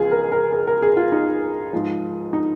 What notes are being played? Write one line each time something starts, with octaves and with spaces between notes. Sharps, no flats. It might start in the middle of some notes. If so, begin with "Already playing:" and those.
Already playing: C#2 F3 F4 G#4
A#4
A#4
G#4
A#4
G#4
F4
D#4
G#2 F3
D#4